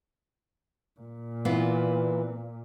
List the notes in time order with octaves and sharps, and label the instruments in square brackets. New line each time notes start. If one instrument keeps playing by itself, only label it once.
[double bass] A#2
[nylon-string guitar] E3 B3 F4